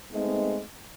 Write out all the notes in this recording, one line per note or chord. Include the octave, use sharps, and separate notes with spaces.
G#3 A3 B3 C4 D#4